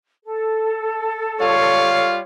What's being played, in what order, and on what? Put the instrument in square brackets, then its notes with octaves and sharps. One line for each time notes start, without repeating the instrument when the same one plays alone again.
[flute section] A4
[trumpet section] G3 F4 F5 [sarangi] C#5